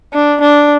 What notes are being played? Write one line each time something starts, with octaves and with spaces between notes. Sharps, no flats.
D4
D4